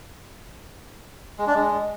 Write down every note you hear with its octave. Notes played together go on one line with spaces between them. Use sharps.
G#3
D4
G#3